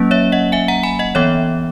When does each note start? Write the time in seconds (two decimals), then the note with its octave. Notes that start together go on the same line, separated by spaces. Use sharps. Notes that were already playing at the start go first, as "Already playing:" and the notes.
Already playing: F#3 A#3 C#4
0.11 C#5 E5
0.32 D#5 F#5
0.52 E5 G#5
0.68 F#5 A#5
0.83 G#5 B5
0.99 D#5 F#5
1.15 E3 B3 C#5 E5